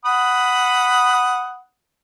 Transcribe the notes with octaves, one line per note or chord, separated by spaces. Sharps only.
F#5 B5 D#6